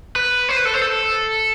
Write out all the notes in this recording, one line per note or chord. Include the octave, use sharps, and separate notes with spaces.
B4
C5
B4
A4
C5
A4